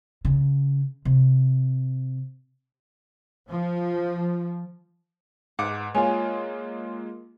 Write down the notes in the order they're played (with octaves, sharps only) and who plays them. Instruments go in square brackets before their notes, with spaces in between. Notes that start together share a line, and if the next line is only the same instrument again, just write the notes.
[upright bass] C#3
C3
[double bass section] F3
[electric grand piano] G#2 D6 [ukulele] B4 F#5
[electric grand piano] G#3 A#3 F4 [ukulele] C#5 G#5